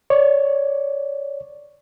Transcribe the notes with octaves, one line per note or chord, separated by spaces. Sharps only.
C#5 D5